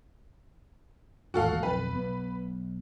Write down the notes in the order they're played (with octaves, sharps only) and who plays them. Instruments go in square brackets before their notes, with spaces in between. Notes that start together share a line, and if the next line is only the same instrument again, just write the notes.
[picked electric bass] A1 D#2 G#2 [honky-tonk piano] F#4 A4 F5
[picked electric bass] B1 F2 [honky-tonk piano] B4
[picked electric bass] B1 B2 B3